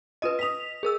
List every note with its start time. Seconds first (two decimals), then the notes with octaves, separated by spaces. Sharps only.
0.22 F4 B4 D#5 D#6 D#7
0.39 D#5 D#6 B6 F7
0.83 G#4 A#4 E6